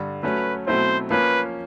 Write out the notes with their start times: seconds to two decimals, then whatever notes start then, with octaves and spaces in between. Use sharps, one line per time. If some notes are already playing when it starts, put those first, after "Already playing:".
Already playing: G2 D3
0.23 F#3 A3 C#4 B4
0.67 B2 F#3 A3 C4 E4 C5
1.10 F3 A#3 C#4 B4